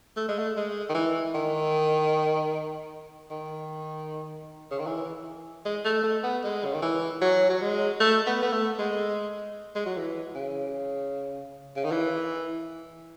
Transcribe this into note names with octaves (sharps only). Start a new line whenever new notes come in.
A3
G#3
A3
G#3
D#3
E3
D#3
D#3
C#3
D#3
E3
G#3
A3
A3
B3
G#3
C#3
D#3
E3
F#3
F#3
G#3
A3
B3
B3
A3
G#3
G#3
F#3
E3
C#3
C#3
D#3
E3